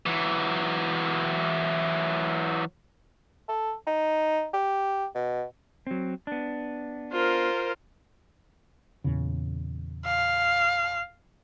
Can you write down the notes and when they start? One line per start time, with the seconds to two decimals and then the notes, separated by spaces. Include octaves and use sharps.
0.06 E3 F#3
3.49 A4
3.87 D#4
4.54 G4
5.15 B2
5.87 F#3 C4
6.27 B3 D4
7.13 F4 A#4 C5
9.04 E2 A#2 C#3
10.05 F5